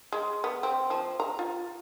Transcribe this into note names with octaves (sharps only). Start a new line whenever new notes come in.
G#3
B3
C4
F3
A#5
F4